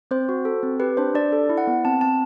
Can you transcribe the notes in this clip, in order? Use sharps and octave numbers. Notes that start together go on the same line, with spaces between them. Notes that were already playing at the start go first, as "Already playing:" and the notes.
C4 C5
F#4
A4
C4
G4 B4
D4 C5
D4 D5
A4
E4
F#5
B3
C4 A5
C4 A5